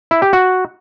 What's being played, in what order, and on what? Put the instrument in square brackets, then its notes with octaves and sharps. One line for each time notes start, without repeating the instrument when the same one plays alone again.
[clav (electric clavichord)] E4
G4
F#4